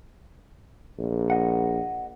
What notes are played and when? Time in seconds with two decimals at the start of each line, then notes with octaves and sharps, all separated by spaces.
0.99 A#1
1.30 D#5 F#5